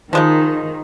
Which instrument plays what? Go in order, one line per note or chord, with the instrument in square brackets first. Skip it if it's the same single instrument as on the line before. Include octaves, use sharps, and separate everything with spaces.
[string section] D#3 [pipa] F3 G#3 D#4